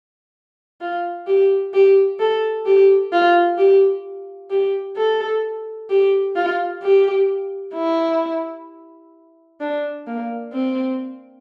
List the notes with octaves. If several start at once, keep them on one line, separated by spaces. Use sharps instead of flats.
F4
G4
G4
A4
G4
F4
G4
G4
A4
G4
F4
G4
E4
D4
A#3
C4